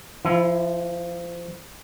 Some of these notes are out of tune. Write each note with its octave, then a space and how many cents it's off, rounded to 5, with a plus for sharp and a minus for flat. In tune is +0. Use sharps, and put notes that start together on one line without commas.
F3 -20 E4 +10